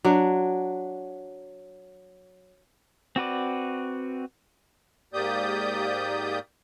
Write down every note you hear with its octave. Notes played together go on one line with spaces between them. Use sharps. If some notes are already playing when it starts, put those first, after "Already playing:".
F#3 D4
C4 F#4 B4 D5
G#2 A#3 G4 D5 D#6 G6